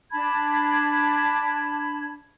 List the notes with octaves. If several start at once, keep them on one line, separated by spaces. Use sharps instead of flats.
D4 A5 B5 G#6